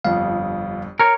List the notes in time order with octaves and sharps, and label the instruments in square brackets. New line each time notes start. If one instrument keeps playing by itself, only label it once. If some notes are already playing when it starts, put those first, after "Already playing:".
[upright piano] G1 F2 [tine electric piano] F5
[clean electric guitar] A#4 C#5